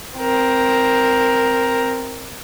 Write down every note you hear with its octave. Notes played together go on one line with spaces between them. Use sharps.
C4 A#4